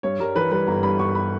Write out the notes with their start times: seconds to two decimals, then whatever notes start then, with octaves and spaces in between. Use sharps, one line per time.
0.03 G2 C#5
0.19 G3 A#4
0.35 E3 B4
0.51 G3 B4
0.67 G1 A#5
0.83 G2 B5
0.99 G1 C#6
1.15 B5